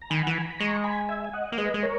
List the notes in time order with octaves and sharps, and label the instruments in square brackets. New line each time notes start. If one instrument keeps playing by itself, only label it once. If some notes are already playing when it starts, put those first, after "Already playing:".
[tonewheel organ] A#5
[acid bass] D#3 [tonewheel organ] G#5 B5
[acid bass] E3 [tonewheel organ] F#5
[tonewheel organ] G#5
A#5
B5
[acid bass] G#3 [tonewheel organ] A#5 C#6
[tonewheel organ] G#5 B5
E5 G#5
G#5
D#5 F#5
[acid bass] A#3
[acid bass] G#3 [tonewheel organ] B4 D#5
[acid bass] G#3
[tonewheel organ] A#4 C#5